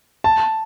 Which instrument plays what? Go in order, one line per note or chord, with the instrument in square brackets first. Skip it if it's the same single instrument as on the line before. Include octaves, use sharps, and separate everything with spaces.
[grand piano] A5